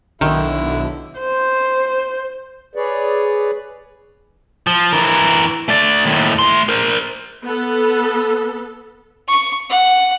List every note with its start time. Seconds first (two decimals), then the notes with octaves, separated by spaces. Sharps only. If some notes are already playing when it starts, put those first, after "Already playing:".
0.21 B1 D3 D#3 E4
1.19 C5
2.75 G#4 B4 C#5 D5
4.67 F3
4.93 E3 A#4
5.68 A3 D5
6.06 D#2 A2
6.39 A3 C6
6.69 A#4 C5
7.43 B3 A4
9.28 C#6
9.70 F#5